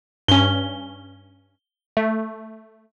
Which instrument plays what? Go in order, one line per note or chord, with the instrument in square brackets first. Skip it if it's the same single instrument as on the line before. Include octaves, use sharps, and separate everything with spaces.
[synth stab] G2 C#4 [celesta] G7
[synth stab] A3